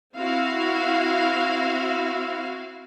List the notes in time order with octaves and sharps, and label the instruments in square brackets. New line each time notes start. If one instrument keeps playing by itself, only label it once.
[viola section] C4 E4 F#4 F5